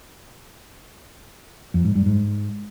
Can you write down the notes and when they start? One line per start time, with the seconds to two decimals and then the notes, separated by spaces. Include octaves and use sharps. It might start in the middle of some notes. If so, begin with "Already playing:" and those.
1.74 F2
1.85 G#2
1.95 G2
2.06 G#2